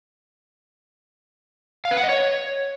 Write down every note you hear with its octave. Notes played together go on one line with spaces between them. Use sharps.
F5
B4
F#5
D#5
C#5